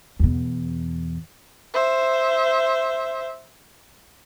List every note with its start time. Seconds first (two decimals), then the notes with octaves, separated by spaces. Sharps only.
0.20 E2 B2
1.74 C5 E5